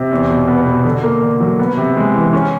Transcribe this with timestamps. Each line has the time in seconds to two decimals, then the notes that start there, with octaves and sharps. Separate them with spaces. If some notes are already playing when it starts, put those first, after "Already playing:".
Already playing: C3
0.12 E2
0.30 B2
0.48 B3
0.67 B2
0.85 D3
1.03 A#3
1.22 D3
1.40 F#3
1.59 B3
1.77 C3
1.96 G#3
2.15 E3
2.33 C#4